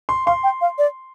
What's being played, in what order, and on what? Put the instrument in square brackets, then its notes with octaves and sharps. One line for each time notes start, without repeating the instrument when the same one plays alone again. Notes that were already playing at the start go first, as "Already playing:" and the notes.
[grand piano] C6
[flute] F5 [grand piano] C6
[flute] G5
F5
D5